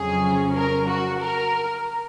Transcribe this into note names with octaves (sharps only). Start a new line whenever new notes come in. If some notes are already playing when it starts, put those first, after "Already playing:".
Already playing: F2 C#3 F#3 C#4 G#4
A#4
F#4
A#4